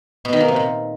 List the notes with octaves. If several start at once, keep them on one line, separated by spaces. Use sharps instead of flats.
B2
D#3
A#3
C3
A#2